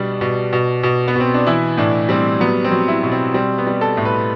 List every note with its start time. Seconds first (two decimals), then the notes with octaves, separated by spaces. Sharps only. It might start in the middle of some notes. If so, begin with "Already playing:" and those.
Already playing: B2 G3 D4
0.21 B2
0.53 B2
0.83 B2
1.08 B3
1.16 B2 C4
1.34 D4
1.47 E3 E4
1.78 A2 D4
2.09 G3 C4
2.40 F#3 B3
2.64 C4
2.71 F#3
2.88 E4
3.03 B2
3.12 C4
3.34 G3 C4
3.58 B3
3.67 G3
3.81 A4
3.97 A2
4.05 B4